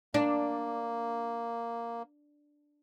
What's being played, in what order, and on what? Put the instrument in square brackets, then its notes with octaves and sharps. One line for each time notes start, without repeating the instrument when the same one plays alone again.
[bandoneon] A#3 [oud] D4